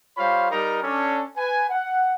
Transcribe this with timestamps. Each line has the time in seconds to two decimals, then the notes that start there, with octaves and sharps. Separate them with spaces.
0.17 G3 F4 C5 C#5 F5 B5
0.51 G3 D#4 G4 A#4 A#5
0.83 C#4 D4 A4
1.37 B4 G#5
1.70 F#5